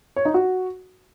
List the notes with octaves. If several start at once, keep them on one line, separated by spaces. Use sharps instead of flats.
C#5
D#4
F#4